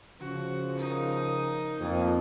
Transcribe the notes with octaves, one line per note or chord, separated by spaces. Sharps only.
C#3 F3 F#4
D#4 A#4
F2 A#3